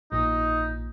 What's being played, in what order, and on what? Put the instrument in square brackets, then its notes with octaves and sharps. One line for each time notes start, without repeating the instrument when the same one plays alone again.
[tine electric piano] A#1 A#2 [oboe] D#4